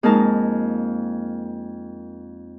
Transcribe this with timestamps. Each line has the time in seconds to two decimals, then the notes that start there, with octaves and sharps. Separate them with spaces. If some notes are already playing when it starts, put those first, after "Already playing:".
0.03 F2 G#3 A#3 D#4 A#4 A5